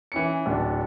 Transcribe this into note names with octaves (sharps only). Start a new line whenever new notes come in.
E3 C#4 C#7
D1 D4